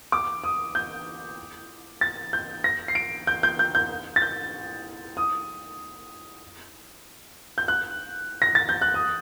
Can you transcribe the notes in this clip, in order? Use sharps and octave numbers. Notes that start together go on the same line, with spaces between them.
D6
D#6
G6
A6
G6
A#6
C7
D7
G6
G6
G6
G6
A6
G6
D#6
G6
F#6
A#6
A6
G6
F#6
D#6